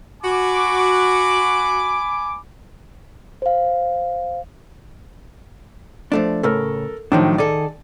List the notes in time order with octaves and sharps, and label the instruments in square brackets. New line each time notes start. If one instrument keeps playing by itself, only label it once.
[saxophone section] F#4 [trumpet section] G#5 B5 D6
[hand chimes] C5 F5
[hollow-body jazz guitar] F3 A3 D4
[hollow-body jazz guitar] A2 C#3 [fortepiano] A4 A#4
[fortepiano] A2 D#3 [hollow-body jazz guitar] F3 F#3 D4
[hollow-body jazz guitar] D#3 G#4 A4 [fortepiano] D5